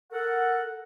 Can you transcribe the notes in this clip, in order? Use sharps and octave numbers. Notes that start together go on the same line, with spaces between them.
A4 A#4 F#5